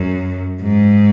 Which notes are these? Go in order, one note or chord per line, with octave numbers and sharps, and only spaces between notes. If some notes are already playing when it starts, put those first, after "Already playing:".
Already playing: F#2
G#2